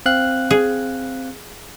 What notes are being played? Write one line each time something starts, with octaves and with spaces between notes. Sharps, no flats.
C4 F5 F#6
G#4